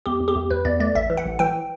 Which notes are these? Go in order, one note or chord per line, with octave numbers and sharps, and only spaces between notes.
E2 G4
E2
G4
E2
E2 B4
E2 D5
A3 D5
A1 E5
E3
F#5
A1
E3 G5